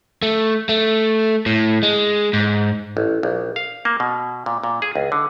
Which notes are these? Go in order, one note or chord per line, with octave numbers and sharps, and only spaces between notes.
A3
A3
A2
G#3
G#2
A1
A#1
F5
A#3
B2
A#2
A#2
G#4
C#2
D3